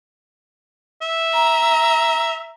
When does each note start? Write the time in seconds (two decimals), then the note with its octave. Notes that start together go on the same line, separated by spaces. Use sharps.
1.02 E5
1.34 A#5